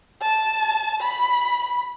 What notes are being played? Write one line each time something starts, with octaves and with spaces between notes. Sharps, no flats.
A5
B5